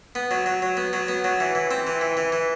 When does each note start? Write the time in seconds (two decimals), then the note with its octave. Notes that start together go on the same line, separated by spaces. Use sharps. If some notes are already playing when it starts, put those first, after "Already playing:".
0.15 B3
0.31 F#3
0.46 F#3
0.62 F#3
0.77 B3
0.93 F#3
1.08 B3
1.24 F#3
1.40 E3
1.55 E3
1.71 C4
1.87 E3
2.01 E3
2.17 E3
2.32 E3